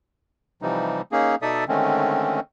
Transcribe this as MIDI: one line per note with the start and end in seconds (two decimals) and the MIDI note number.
0.62 1.01 48
0.62 1.01 52
0.62 1.01 53
0.62 1.01 55
0.62 1.01 63
1.12 1.35 58
1.12 1.35 61
1.12 1.35 63
1.12 1.35 68
1.42 1.64 47
1.42 1.64 63
1.42 1.64 69
1.42 1.64 74
1.42 1.64 76
1.42 1.64 87
1.68 2.40 50
1.68 2.40 51
1.68 2.40 56
1.68 2.40 57
1.68 2.40 60
1.68 2.40 61